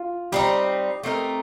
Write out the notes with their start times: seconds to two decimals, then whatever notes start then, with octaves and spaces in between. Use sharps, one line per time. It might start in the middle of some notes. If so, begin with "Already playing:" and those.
Already playing: F4
0.32 G3 C4 D#4 G4
1.03 A3 C4 D#4 A#4